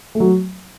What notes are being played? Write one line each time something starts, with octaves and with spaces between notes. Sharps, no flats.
A3
F#3